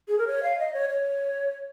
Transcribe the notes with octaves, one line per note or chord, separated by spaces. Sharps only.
G#4
A#4
C#5
F5
D#5
C#5
C#5